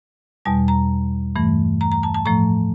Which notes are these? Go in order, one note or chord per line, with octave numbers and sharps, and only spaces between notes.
E2 B2 G3 A5
A#5
G2 E3 A3
A#5
A#5
A5
A5
A2 F3 A3 A#5